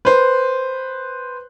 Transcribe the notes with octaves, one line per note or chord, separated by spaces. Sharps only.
B4 C5